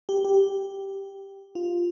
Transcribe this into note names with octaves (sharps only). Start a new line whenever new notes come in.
G4
G4
F4